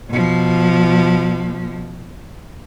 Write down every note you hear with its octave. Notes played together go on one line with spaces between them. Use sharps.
B2 F3